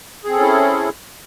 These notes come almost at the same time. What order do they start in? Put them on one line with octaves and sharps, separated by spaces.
G#4 C4 A4 C#4 E4